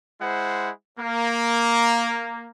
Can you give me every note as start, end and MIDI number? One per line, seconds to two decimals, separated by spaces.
0.21 0.70 56
0.21 0.70 64
0.21 0.70 72
0.21 0.70 78
0.99 2.48 58